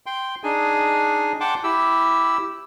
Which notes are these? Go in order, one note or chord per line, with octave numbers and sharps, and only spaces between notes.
G5 C6
D4 D#4 G#4 G#5
F#5 G5 A5 C6 D6
E4 G4 E6